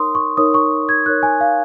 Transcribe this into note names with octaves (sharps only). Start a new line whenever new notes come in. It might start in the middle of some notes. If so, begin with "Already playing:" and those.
Already playing: D#4 A#4 C#5 C6 D#6
C#6
D#4 A#4 C#5 D#6
C#6
G#6
D#4 A#4 C#5 F#6
G#5
F5